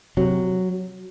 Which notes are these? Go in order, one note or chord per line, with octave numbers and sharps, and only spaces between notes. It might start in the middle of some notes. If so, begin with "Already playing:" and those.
C3 F#3